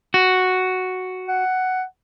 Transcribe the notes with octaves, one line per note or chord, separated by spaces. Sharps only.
F#4
F#5